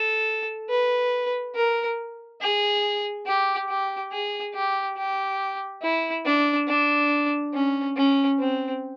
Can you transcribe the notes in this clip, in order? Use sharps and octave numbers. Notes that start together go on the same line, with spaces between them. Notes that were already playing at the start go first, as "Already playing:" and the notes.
Already playing: A4
B4
A#4
G#4
G4
G4
G#4
G4
G4
E4
D4
D4
C#4
C#4
C4